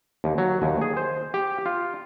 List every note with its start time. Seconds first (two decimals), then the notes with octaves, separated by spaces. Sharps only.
0.24 D#2
0.38 F#3
0.62 D#2
0.81 G#4
0.97 C5
1.34 G4
1.66 F4